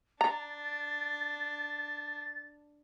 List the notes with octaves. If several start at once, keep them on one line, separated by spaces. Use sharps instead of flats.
D4 A#5 A6